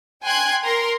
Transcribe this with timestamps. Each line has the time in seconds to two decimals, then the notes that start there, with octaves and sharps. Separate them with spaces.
0.23 G5 G#5 C6 F#6 G#6
0.63 A#4 A#5 C6